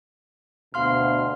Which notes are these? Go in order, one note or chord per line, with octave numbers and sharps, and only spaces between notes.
D2 B2 F5 C6 F6